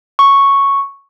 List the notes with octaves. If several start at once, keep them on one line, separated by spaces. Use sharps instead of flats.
C#6